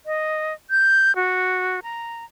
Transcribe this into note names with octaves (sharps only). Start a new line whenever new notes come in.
D#5
G6
F#4
A#5